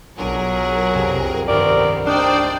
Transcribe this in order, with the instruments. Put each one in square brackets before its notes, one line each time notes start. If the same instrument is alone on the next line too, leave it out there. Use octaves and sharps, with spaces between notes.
[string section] B1 G#4 A#4 [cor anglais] F#3 [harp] D4 F4
[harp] C2 F2 C3
[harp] G2 G4 [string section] D#3 B3 C4 [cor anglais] A#4 [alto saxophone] D5
[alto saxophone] D4 [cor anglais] D#4 [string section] C5 D5 G5